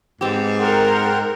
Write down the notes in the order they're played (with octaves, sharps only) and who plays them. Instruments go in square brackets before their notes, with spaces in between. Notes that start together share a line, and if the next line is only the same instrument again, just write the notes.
[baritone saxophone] G#2 [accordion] B3 [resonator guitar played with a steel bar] C4 G4
[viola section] A#4 [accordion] F#5 G5 C6